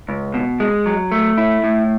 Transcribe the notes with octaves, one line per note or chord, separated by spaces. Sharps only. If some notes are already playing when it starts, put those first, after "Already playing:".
C#2
B2
G#3
F#3
A3
E4
A2